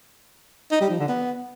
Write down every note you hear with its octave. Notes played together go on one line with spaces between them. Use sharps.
D#4
G3
F3
D3
B3